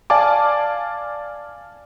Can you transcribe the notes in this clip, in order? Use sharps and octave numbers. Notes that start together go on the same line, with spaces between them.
D5 F5 G#5 A5 D6